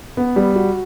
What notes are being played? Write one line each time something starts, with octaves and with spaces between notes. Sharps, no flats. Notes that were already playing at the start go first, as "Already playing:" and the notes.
B3
G3
F#4